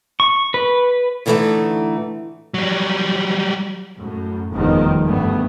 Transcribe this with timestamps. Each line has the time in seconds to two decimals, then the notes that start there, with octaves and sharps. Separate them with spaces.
0.20 C#6
0.54 B4
1.26 A2 D3 E3 G#3 A3 D#4
2.54 F#3 G3
3.98 F#2 A2
4.52 F1 E2 D#3 F3 G3
5.03 D2 G2 A3 B3